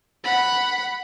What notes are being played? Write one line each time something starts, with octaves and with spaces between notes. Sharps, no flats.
F#5 B5